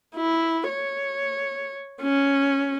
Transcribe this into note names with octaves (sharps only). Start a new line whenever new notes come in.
E4
C#5
C#4